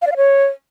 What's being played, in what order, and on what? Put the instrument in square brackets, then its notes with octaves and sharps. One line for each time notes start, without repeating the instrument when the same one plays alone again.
[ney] F5
D5
F5
C#5